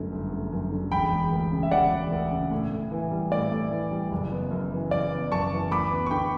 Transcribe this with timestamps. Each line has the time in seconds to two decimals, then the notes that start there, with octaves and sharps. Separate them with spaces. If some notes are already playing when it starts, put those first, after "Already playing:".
Already playing: G1 F#2 D3 A3
0.12 G1
0.32 A3
0.52 F#2
0.71 D3
0.91 E1 G5 B5
1.11 E1
1.32 D2
1.52 C#3
1.63 E5
1.71 E1 D5 F#5
1.91 E1
2.12 D2
2.31 C#3
2.51 A2
2.72 A2
2.91 E3
3.11 G3
3.31 A2 D5
3.51 A2
3.71 E3
3.91 G3
4.12 F#1
4.32 B3
4.51 F#2
4.72 E3
4.91 F#1 D5
5.11 B3
5.32 F#2 A5 C#6
5.51 E3
5.71 D2 B5 D6
5.91 B3
6.06 C#6
6.11 D3 G5 B5